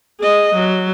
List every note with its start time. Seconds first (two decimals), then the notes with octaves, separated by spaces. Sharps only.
0.20 G#4 D#5
0.55 F#3